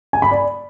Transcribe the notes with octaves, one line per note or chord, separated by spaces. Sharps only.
G#5
B5
D5